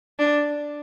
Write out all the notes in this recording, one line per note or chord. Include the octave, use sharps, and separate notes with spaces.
D4